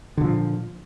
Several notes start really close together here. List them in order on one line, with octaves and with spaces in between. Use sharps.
D3 A#2 F3